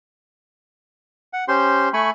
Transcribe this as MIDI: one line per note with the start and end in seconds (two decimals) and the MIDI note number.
1.33 1.44 78
1.48 1.89 61
1.48 1.89 67
1.48 1.89 72
1.48 1.89 84
1.93 2.10 57
1.93 2.10 80
1.93 2.10 83
1.93 2.10 85